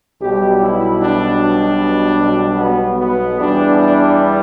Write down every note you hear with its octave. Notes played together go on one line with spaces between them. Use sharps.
B1 B2 G3 G4
E4
D4
B3
B3
E2 E3 G3 B3 D4
D4